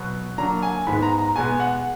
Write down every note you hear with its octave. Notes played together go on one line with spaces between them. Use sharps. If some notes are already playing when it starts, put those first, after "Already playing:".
Already playing: B2 F#3 B3
D3 F#3 A#3 A#5
G#5
G#2 D#3 G#3 B3 B5
A#5
A#5
B2 G#3 B3 G#5
F#5